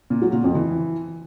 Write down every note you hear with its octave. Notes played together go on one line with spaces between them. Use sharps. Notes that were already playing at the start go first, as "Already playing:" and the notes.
A#2
F#3
A#2
F2
E3